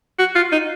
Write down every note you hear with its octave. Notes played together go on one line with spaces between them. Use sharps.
F#4
F4
D#4